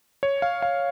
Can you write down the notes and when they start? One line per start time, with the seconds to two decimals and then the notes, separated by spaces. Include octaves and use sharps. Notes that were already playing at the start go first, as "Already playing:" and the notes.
0.23 C#5
0.42 F5
0.62 F5